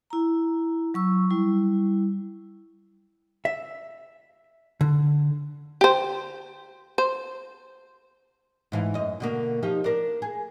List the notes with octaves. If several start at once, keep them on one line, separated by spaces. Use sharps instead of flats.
E4 A#5
F#3 C#6 E6
G3 E4
E5
D3
G4 C5
C5
G#2 E3 F5
F#2 D#5
B2 D3 A#3
F3 D#4 G4
D4 A#4
G#4